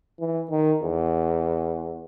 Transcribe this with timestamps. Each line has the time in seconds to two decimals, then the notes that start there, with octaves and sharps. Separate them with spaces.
0.20 E3
0.50 D#3
0.83 E2